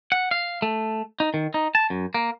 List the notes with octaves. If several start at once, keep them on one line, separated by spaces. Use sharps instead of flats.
F#5
F5
A3
D#4
D#3
D#4
A5
F#2
A#3